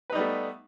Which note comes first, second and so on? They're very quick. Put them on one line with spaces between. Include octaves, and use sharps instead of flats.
B4 D#4 G3 B3 A3